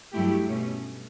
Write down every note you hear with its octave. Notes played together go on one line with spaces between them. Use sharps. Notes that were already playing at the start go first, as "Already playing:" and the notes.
G2 F#3 A3 E4 G4
B2 A3 C#4